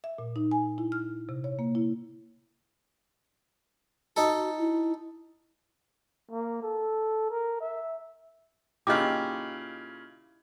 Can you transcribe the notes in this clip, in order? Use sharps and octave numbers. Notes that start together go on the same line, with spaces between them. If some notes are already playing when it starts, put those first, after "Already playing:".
E5
A#2
D#4
G#5
E4
F6
C3
C#5
A#3
E4
D#4 F#4 A4
E4
A#3
A4
A#4
E5
A#2 C#3 D#4 E4 G4 D#5 D6